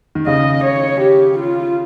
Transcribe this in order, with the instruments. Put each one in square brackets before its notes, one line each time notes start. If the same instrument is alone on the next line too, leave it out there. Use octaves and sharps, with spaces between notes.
[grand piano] D#3
[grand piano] C#3 [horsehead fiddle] D#5
[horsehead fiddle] C#5
G4
F4